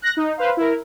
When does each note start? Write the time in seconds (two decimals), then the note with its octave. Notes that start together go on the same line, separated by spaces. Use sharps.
0.02 F#6 A#6
0.17 D#4
0.37 B4 C5 F5
0.57 E4 A#4